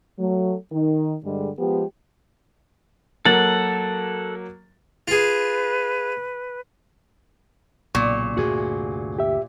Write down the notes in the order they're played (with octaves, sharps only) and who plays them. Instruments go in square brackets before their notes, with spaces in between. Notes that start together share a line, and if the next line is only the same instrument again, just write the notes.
[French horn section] F#3 A3
D#3 D#4
G2 D3 G3 G#3
F3 G#3 B3 G4
[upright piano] F#3 A#3 A6 [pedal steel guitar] A4 F#5
[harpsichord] F4 G#4 [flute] B4
[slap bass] B1 C#3 [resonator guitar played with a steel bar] A#2 [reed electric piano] C#6
[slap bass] D2 G2 C3 [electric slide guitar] F#4 G#4
[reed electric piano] G4 E5